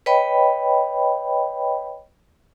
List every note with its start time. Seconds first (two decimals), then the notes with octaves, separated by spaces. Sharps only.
0.06 B4 C#5 D#5 G5 B5